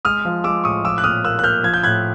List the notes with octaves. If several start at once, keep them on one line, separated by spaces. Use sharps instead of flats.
G#3 D#6 F6
F3
G#3 D6 E6
A2 C#6 D#6
F3 D6 E6
F#6
A#2 D#6 F6
A#3 E6 F#6
F#6
A#3 F6 G6
F3 G#6
G6
A2 F#6 G#6